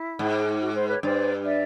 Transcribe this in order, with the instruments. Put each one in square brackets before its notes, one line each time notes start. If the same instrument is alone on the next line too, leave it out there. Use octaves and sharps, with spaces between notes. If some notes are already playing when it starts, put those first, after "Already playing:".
Already playing: [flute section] E4
[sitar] G#2
[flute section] F#4
C5
B4 C#5
[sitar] G2 [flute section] C5 D5
[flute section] D5 E5